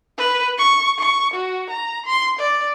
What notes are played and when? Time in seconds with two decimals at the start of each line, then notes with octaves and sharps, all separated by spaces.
0.18 B4
0.58 C#6
0.99 C#6
1.34 F#4
1.70 A#5
2.06 C6
2.39 D5